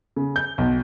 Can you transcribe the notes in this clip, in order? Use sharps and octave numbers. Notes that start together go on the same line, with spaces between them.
C#3
G6
B1